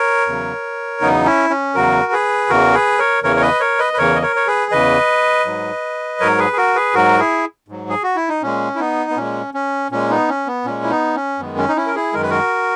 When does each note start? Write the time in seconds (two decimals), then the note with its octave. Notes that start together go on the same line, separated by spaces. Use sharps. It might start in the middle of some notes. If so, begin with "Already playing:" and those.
Already playing: A#4 C#5
0.27 E2 C#3 F#3
1.01 E2 C#3 F#3 B3 D#4
1.25 C#4 E4
1.50 C#4
1.75 E2 C#3 F#3 F#4 A#4
2.12 G#4 B4
2.49 E2 C#3 E3 F#4 A#4
2.74 G#4 B4
2.98 A#4 C#5
3.23 E2 C#3 E3 A#4 C#5
3.36 C#5
3.42 B4 D#5
3.60 A#4 C#5
3.79 B4 D#5
3.93 B4
3.98 E2 C#3 E3 A#4 C#5
4.15 D#5
4.22 A#4 C#5
4.36 C#5
4.47 G#4 B4
4.71 E2 C#3 E3 B4 D#5
5.46 G#2 F#3
6.20 G#2 F#3 A#4 C#5
6.38 G#4 B4
6.53 G#4
6.57 F#4 A#4
6.75 G#4 B4
6.94 G#2 F#3 F#4 A#4
7.19 E4 G#4
7.68 G#2 F#3
7.89 G#4
8.03 F#4
8.16 E4
8.29 D#4
8.42 A#2 G#3 C#4
8.75 E4
8.80 B3 D#4
9.10 B3
9.16 A#2 G#3 C#4
9.54 C#4
9.91 A#2 G#3 C#4
10.10 B3 D#4
10.28 C#4
10.47 B3
10.65 A#2 G#3 C#4
10.84 E4
10.90 B3 D#4
11.15 C#4
11.39 F#2 D#3 G#3 B3
11.58 C#4
11.68 D#4
11.76 C#4 E4
11.86 A#4
11.95 E4 G#4
12.13 F#2 D#3 G#3 A#4
12.22 B4
12.30 F#4 A#4